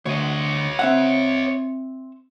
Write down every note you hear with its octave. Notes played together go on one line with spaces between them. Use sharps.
D2 C#5 D#5
C4 E5 F#5